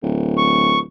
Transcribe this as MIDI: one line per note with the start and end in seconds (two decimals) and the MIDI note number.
0.03 0.83 26
0.38 0.79 85